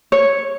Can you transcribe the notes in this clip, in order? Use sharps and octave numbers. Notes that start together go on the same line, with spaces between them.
C#5